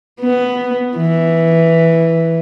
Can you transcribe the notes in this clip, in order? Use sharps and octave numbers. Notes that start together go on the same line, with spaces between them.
B3
E3